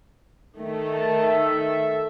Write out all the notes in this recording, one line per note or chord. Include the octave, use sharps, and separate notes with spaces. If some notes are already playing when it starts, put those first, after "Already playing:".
D#3 A3
A5
A4 E5